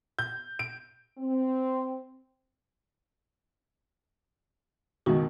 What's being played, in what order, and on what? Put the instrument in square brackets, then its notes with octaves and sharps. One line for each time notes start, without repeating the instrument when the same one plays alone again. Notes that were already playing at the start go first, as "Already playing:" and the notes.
[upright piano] G6
D7
[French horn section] C4
[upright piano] C#2 B2 D#3 [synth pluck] G#3 F#4